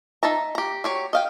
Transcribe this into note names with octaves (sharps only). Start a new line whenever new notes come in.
D#4 E5 A5 A#5
G4 A#5
F#3 G4 C#5
D#5 F5 G5